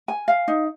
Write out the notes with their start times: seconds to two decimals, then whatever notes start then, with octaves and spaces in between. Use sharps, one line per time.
0.08 G#5
0.28 F5
0.48 D#4